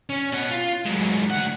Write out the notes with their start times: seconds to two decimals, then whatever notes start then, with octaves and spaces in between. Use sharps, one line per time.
0.10 C#4
0.32 B2 F#5
0.50 F4
0.85 G#2 F#3
1.31 D2 F#5